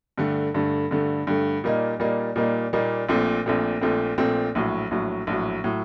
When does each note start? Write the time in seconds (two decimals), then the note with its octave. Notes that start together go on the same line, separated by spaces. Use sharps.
0.18 G2 D3 A3
0.54 G2 D3 A3
0.91 G2 D3 A3
1.27 G2 D3 A3
1.64 A#2 G3 A#3 D#4
2.00 A#2 G3 A#3 D#4
2.36 A#2 G3 A#3 D#4
2.73 A#2 G3 A#3 D#4
3.09 A#1 A#2 A3 C4
3.46 A#1 A#2 A3 C4
3.81 A#1 A#2 A3 C4
4.18 A#1 A#2 A3 C4
4.55 A#1 A2 F#3
4.91 A#1 A2 F#3
5.27 A#1 A2 F#3
5.64 A2 F#3